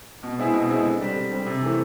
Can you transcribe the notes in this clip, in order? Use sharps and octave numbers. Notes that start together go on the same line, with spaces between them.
B2
G#3 C4 E4 G#4
B2
G#3 C4 E4 G#4
D3
G3 C4
D3
G3 C4
C3
E3 A3 C4